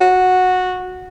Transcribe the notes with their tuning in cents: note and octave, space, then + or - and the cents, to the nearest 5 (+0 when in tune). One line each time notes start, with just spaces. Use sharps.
F#4 -10